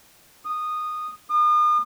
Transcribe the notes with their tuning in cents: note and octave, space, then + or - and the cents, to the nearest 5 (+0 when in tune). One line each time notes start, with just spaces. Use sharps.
D#6 -15
D#6 -40